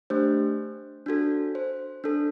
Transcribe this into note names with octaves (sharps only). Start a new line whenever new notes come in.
A3 D4 G4 C5
D4 F#4 A4
C5
D4 A4